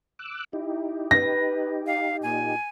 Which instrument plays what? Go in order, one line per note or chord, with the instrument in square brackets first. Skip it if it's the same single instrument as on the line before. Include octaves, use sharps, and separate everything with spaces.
[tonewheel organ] D6 E6 F#6
[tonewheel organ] D#4 G4 [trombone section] E4
[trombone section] B4 [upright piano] A#6
[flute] F5
[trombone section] A#2 [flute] G#5